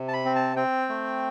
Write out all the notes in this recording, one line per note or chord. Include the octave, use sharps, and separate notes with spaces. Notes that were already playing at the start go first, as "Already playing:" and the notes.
Already playing: C3
A5
B5
C4
A5
C4 G5
A3